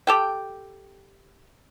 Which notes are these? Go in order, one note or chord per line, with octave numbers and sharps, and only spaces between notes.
G4 A4 G5